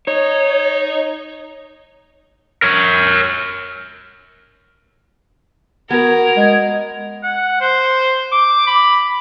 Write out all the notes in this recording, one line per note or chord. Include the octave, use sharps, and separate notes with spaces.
D#4 C#5
A#4 C#5
B3 F#4 A#4 G#6
G#3
F#5
C5
D6
B5